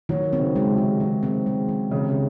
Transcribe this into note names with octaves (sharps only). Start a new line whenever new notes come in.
D#3 F#3
C4
C#3
G#3
C3
D#3
C3 D#3
C4
G#3
D#3
C#3 E3
C3
C#3